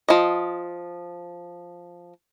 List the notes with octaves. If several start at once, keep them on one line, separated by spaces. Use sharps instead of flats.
F3 D#5